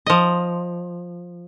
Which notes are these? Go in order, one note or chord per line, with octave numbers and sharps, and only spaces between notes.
F3 D#5